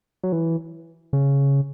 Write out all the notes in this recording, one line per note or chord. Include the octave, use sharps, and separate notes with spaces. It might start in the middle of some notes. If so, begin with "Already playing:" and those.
F#3
E3
C#3